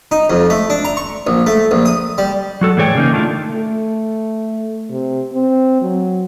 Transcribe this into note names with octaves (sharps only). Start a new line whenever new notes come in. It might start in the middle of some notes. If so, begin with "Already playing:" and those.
D#4
F2
A3
D4
A#5
C#6
A#1
A3
A#1
D#6
G3
F#3 F#4 A4
A2 E3 G#4 C#5 D5 G5
C#3 A#3 C4 D#4
D#3 A3 D4 E4 F4
A3
C3
C4
F#3